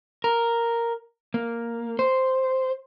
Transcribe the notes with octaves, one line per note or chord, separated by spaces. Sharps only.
A#4
A#3
C5